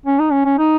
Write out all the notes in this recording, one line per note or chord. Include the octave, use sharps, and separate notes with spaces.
C#4
D#4
C#4
C#4
D#4